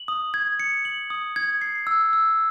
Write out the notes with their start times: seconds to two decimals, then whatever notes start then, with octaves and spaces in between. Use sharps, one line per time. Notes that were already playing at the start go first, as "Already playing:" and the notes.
Already playing: F#7
0.08 D#6
0.34 G#6
0.60 C#7
0.85 F#7
1.10 D#6
1.36 G#6
1.61 C7
1.87 E6
2.13 E6